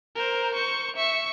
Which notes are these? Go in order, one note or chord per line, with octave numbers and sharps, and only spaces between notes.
A#4 C5
C5 C#6
E5 C#6